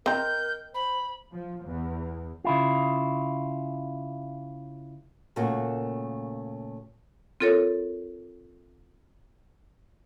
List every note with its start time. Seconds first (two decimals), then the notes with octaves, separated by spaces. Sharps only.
0.06 C4 A#4 D#5 G5 A#5 G6
0.74 C5 B5
1.32 F3
1.64 E2
2.44 C#3 E4 F4
5.36 A#2 C#3 A3 A#3 F#4
7.40 C4 F4 A4 A#4 C#5